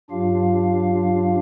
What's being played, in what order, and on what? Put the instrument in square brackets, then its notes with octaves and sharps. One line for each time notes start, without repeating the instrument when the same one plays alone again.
[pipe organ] G2 F#3 D4 F4 G4 F5